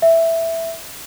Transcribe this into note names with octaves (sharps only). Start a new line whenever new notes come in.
E5